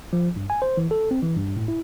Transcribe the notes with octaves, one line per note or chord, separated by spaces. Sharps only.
F3
G2
G#5
C5
E3
A4
C4
E3
G2
A2
E4